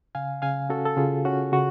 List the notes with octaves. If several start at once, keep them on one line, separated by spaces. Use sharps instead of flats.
C#3 F5 G#5
C#3 F5 G#5
C#4 F#4 A4
A4
C#3 F4 G#4
C#4 F#4
C#3 F#4